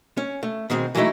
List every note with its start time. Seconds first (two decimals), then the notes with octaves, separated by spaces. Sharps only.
0.17 C#4
0.43 A3
0.70 B2 D#3 G#3 A#3 C4
0.95 E3 F#3 G#3 A3 D#4 E4